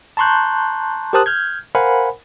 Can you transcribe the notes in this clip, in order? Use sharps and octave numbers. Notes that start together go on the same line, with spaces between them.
A5 A#5 C6 C#6 F#6 G6
G4 A#4 C5 A5 D#6 F#6
F6 G6 G#6
A#4 C5 F5 F#5 G#5 B5